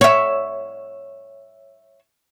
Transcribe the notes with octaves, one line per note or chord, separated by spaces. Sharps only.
C#5 E5